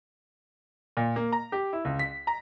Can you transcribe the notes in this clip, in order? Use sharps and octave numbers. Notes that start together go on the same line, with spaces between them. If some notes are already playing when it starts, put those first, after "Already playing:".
A#2
A#3
A#5
G4
E4
C#2
B6
A#5